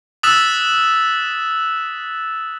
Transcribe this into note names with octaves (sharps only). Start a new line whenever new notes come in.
D#6 E6 F#6 A6 B6 E7